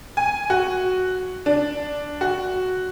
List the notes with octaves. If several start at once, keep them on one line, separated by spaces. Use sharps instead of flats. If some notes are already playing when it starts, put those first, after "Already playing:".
G#5
F#4
D4
F#4